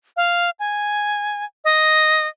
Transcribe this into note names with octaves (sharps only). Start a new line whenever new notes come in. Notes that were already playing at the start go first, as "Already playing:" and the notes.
F5
G#5
D#5